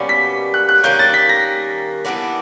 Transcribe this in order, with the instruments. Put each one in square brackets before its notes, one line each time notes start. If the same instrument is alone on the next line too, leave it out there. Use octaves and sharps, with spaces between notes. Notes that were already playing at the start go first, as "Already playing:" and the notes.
Already playing: [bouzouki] B2 G3 A#3 C#4
[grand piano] B6
F#6
F#6
[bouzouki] D#3 G3 A#3 C#4 [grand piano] G6
[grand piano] A6
B6
A#6
[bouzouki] E3 G3 B3 D4